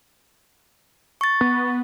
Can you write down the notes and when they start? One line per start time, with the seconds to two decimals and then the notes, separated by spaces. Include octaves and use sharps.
1.21 C#6 A6
1.41 B3